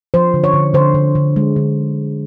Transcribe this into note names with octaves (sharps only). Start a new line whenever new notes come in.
F3 C5
D3
C#5
D3
D3 C5
D3
D3
G#3
D3